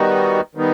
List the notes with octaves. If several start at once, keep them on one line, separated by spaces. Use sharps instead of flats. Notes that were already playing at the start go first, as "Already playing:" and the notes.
Already playing: D#3 G3 B3 D#4 F#4
D#3 G3 B3 D#4